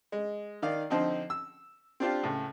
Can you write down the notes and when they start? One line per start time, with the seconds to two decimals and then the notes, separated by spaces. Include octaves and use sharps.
0.12 G#3
0.62 D#3 D#4 D5 F5
0.90 D3 F3 C4 D#4
1.30 E6
2.00 C4 D4 F4 G4
2.23 C#2 A2